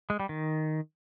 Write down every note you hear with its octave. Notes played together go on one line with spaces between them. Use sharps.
G#3
G3
D#3